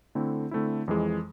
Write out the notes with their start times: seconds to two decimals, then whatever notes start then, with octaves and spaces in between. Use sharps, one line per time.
0.15 D3 A3 C4 E4
0.51 D3 A3 C4 E4
0.88 F2 E3 G#3